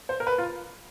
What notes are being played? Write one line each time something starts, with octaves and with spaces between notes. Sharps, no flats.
C5
A#4
B4
F4